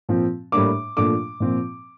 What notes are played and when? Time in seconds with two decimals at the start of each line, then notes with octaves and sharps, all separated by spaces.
0.09 A#2 F3 C4
0.52 A2 G3 A#3 D4 D6
0.97 A#2 F3 A3 D4 D6
1.40 A#2 F3 C4